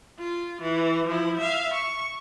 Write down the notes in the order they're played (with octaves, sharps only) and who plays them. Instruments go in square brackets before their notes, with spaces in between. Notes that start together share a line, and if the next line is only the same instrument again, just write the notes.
[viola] F4
E3
F3 E4
E5 F5
C#6